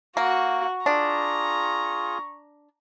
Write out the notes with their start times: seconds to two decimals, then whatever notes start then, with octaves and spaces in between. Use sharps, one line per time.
0.17 A#3 F#4 C#6
0.86 D4 F4 G#4 A#5